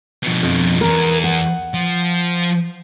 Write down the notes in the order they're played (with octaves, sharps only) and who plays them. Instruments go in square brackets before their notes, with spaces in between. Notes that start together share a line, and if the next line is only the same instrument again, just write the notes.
[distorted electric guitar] B2 F3
[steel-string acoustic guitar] F2
[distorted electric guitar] E2 [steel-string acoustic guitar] A#4
[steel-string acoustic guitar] F#5
[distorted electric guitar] F3